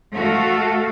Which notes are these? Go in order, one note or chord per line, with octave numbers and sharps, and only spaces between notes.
A3 F#4 A4 F5